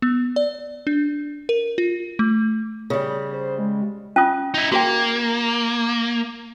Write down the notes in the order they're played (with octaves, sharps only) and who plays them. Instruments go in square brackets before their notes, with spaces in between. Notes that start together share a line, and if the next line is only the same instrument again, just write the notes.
[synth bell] B3
D5
D4
A#4
F4
A3
[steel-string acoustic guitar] C#3 G3
[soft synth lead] C5
G#3
[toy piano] C#4 F4 D#6
[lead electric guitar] D#4 E4
[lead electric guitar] A#3 [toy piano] F#4 G#4 G5